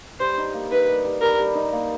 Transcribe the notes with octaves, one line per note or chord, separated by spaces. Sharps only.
G3 C5
D#4
A#3
D#4 B4
G3
G3
G3 A#4
G3
D#4
A#3